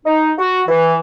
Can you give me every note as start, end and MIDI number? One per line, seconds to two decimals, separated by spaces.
0.06 0.32 63
0.38 0.62 66
0.68 0.96 52